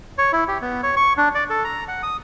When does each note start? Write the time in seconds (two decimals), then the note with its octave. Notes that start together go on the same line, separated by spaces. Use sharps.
0.18 C#5
0.33 E4
0.48 G4
0.61 B3
0.83 C#5
0.97 C#6
1.17 D4
1.35 D5
1.50 A4
1.64 A#5
1.88 F#5
2.03 D#6